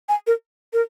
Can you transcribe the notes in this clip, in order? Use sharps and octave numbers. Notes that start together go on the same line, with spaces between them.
G#5
A#4
A#4